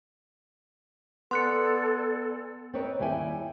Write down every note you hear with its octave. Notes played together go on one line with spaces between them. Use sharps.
B3 A4 D5 G#5 C6 F#6 C#7
C4 A#4 B4 C#5 D#5
D#2 G3 E4 G5 G#5